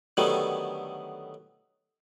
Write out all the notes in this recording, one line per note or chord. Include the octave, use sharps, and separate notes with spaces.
D3 D#3 F#3 G3 A3 B3